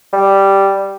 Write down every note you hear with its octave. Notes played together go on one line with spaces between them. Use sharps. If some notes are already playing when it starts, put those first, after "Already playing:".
G3